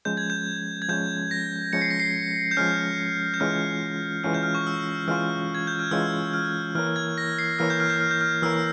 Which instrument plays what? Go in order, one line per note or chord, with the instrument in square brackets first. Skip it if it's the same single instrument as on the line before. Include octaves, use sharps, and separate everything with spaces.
[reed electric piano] F3 G#3 C#4 [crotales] G6
[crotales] G#6
G6
G#6
[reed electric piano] F3 G#3 C#4 [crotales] G6
[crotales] A#6
[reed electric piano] F3 G#3 C#4 [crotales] C#7
[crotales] C7
A#6
C7
G6
[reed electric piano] F3 G#3 C#4 [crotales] F6
[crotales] G6
[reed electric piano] E3 G#3 C#4 F4 [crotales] F6
[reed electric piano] E3 G#3 C#4 F4 [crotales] F6
[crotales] G6
F6
C#6
E6
[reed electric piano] E3 G#3 C#4 F4 [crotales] F6
[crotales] G#6
G6
F6
[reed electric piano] E3 G#3 C#4 F4 [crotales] E6
[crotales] F6
[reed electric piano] E3 A#3 E4 A#4 C#5 [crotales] F6
[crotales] G#6
A#6
C7
[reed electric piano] E3 A#3 E4 A#4 C#5 [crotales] F6
[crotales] G6
F6
G6
F6
G6
F6
[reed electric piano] E3 A#3 E4 A#4 C#5 [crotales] E6